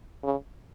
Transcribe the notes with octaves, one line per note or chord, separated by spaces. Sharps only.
C#3